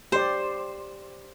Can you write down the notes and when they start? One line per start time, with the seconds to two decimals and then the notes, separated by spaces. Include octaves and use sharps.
0.12 G4 C5 D5